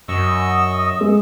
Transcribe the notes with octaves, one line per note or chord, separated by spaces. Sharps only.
F#2 D#5 C#6 D#6 E6
G#3